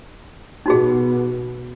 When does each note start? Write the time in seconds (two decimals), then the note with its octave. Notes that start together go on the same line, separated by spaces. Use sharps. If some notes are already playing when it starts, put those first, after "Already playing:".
0.66 B2 B3 D#4 F#4 G#4